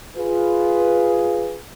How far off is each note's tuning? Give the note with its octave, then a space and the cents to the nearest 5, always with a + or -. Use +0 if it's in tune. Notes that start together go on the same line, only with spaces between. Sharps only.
F4 +0 G#4 +0 B4 +5